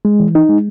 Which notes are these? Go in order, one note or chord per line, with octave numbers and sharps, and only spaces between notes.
G#3
E3
D#4
G#3